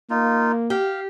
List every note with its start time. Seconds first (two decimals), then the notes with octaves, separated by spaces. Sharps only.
0.10 A#3 D#4 F4
0.70 G4 F5